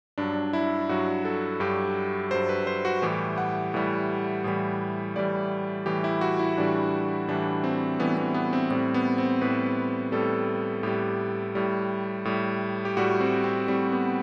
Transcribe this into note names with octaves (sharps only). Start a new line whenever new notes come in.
G2 F#3 D4
E4
G2 F#3 F#4
A4
G2 F#3 G4
G2 F#3 C5
B4
C5
F#4
A2 E3 G3 G4
F#5
A2 E3 G3
A2 E3 G3
A2 E3 G3 D5
A2 E3 G3 G4
E4
F#4
E4
A2 E3 G3 D4
A2 E3 G3 D4
C4
A2 E3 G3 B3
B3
B3
C4
A2 G3 C4
B3
C4
A2 G3 B4
A2 G3 A4
A2 G3 G4
A2 G3
A2 G3
G4
A2 G3 F#4
C4
C4
A2 G3 C4
B3